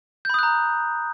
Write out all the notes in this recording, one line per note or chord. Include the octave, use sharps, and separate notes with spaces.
A#5 B5 D#6 F#6 G6